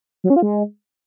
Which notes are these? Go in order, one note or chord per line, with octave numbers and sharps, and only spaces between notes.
F#3
C#4
F4
G#3